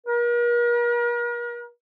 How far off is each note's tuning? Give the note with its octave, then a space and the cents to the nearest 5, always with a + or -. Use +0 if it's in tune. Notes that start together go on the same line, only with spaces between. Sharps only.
A#4 +40